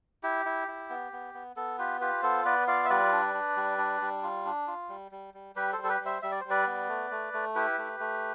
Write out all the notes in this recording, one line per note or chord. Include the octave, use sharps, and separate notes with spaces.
E4 G4
E4
E4
B3
B3
B3
B3 A4
F4 G4 B4
F4 G4 B4
B3 A4 C5
B3 B4 D5
F4 D5 F5
E5
G3 B4 D5
D4
D4
G3
D4
G3
F4
D4
F4
G3
G3
G3
G3 G4 B4
A4 C5
G3
A4
G4 B4
G3
C5 E5
G3 E5
D5
G3 C5
B4 D5
B3
A3
A3
A3
E4 G4 B4
A3
A3